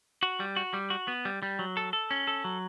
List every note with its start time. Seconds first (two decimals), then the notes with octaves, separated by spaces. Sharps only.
0.23 F#4
0.40 G3
0.56 F#4
0.74 G3
0.90 F#4
1.08 B3
1.25 G3
1.43 G3
1.59 F#3
1.77 A4
1.93 A4
2.11 C#4
2.27 A4
2.44 F#3